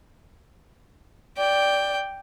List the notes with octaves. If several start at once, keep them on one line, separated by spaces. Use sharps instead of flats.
D5 G5